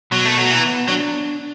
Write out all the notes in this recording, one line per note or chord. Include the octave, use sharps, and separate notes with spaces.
B2 F#3
A3
F#3
E3 B3
F#3 D4